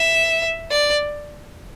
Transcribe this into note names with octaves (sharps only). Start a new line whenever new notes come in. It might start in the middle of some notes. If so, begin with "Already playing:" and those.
Already playing: E5
D5